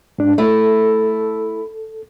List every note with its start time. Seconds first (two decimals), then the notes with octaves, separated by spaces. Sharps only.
0.18 G#2 D4
0.38 A3 E4 A4